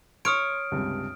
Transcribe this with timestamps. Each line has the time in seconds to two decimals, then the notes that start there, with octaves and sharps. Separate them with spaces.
0.25 C#5 C6 D#6 F6 D7
0.71 C#2 G2 C3